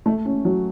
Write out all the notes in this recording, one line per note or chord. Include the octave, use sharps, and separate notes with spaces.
A3
C#4
F#3